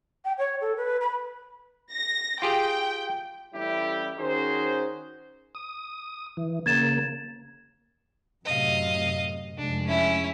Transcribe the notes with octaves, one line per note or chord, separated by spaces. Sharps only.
G5
C#5
A4
B4
B5
A#6
F4 G4 G#4 G5
A1 G3 E4 G4
D#3 C#4 D#4 F#4 G#4 C5
D#6
E3
C#3 A#3 G#6 A6 E7
F#2 A2 C3 D#5 F5
F1 G#3 D4
C#4 E4